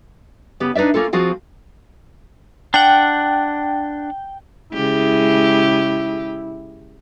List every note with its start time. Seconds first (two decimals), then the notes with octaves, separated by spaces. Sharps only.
0.60 C#3 B3 G4
0.75 D4 D#4 B4 D5 E5
0.94 A#3 C#4 F4 A4
1.13 F3 C4 F4 F#4 G#4
2.74 D4 F#5 G5
4.74 C#3 G#3 E4 G4